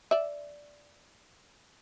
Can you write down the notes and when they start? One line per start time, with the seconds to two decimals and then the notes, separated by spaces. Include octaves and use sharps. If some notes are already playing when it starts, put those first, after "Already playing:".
0.11 D5 E5